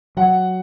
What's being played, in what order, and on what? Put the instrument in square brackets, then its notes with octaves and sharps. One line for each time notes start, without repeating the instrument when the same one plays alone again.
[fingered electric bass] F#3 [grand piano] F#5